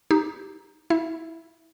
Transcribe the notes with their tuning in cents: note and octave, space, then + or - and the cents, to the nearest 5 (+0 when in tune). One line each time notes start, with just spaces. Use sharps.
D#4 +0 G4 +0
E4 -25 E5 +0